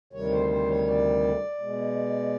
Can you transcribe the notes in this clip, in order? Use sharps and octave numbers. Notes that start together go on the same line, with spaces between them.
D2 C3 D#3 G3 C#5
C5
C5
C#5
D5
B2 G#3